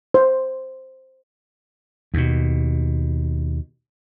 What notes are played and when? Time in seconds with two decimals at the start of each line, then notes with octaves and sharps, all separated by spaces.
0.14 C5
2.14 D#2 B2